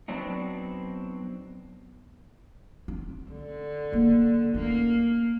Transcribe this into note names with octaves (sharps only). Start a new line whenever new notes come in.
F#3 B3 C4 D4 D#4
C4
D3
C#3 A#3
A#3 C#4 D#4